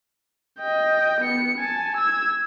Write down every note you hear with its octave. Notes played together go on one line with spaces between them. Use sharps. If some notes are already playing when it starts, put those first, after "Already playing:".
D#5 G5
B3 C#7
G#5 A5
E6 G#6